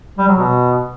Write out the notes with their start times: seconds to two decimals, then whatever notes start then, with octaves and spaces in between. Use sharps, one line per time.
0.18 G3
0.28 F#3
0.38 B2